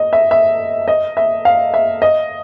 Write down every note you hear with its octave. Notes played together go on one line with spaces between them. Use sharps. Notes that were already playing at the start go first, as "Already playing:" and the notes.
Already playing: D#5
E5
E5
D#5
E5
F5
E5
D#5